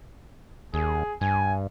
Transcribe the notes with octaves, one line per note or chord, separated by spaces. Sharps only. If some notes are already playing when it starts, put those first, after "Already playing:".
D#2 G#4
G2 G#5